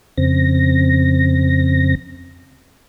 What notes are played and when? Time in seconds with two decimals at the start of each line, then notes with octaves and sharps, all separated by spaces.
0.18 F2 C#3 C4 A#6